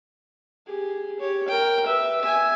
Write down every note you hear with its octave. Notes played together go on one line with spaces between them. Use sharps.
G4 G#4
G4 C#5
A#4 G5
B4 E5
E5 G#5